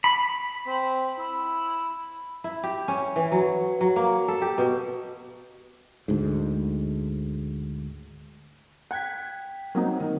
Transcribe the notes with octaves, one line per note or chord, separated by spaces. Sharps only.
B5
C4
E4
E4
G4
C#4
E3
F#3
F#3
A#3
A4
G4
B2
D2 G#2
F#5 G5 G#6 B6
F#3 A#3 C4 D#4
D#3